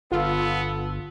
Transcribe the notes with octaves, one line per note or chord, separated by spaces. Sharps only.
G1 B3 F4 A4